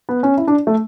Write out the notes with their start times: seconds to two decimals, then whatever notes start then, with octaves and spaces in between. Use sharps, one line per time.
0.09 B3
0.23 C#4
0.37 E4
0.47 D4
0.67 A3